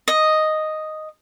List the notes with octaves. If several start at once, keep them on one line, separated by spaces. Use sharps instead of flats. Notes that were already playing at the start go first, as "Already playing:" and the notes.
D#5